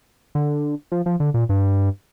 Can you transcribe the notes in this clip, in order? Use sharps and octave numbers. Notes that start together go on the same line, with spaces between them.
D3
F3
F3
D3
A#2
G2